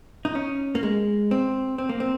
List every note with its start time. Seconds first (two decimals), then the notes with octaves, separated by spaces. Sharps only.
0.25 D#4
0.35 C#4
0.75 A#3
0.83 G#3
1.31 C4
1.78 C4
1.89 A#3
2.00 C4